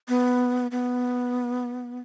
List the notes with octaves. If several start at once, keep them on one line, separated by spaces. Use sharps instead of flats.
B3
B3